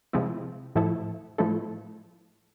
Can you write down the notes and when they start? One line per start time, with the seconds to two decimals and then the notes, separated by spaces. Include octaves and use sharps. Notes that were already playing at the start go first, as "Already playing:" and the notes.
0.13 C3 F3 G#3 C4 E4
0.76 A2 F3 A3 E4 A4
1.38 A2 F3 A3 E4 A4